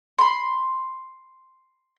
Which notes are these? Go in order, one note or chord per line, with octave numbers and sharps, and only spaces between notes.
B5 C6